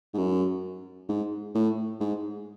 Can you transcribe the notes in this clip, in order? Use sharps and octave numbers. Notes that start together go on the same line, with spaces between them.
G#2
F#2
G#2
A2
G#2